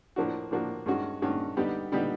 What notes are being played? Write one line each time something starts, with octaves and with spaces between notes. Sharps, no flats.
A2 F3 A#3 D4 F#4
A2 F3 A#3 D4 F#4
G2 D#3 G#3 C#4 F#4
G2 D#3 G#3 C#4 F#4
D3 G3 B3 D#4 G4
D3 G3 B3 D#4 G4